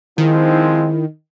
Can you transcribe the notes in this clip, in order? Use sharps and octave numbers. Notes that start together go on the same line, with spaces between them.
D#3 F3 G#3 C4 E4